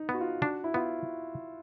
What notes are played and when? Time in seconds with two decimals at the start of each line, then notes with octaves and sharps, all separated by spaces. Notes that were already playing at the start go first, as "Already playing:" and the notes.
Already playing: D#4
0.09 B3
0.14 F#4
0.21 F4
0.42 D4 F#4
0.64 E4
0.74 B3 F4